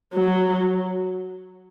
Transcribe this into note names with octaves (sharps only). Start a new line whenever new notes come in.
F#3